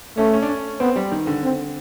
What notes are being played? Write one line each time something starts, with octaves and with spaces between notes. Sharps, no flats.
A3 C#4
C#4
D4
C#4
B3 C4
G3
D#3
D3
C4